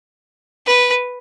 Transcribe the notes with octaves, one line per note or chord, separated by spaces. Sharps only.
B4